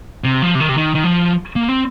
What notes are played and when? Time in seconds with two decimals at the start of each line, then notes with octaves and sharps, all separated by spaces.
0.24 C3
0.42 F3
0.55 C3
0.60 D#3
0.69 C3
0.77 D#3
0.95 D#3
1.04 F3
1.56 A#3
1.68 C4